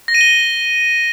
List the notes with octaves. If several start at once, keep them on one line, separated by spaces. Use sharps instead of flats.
A#6
D#7
G7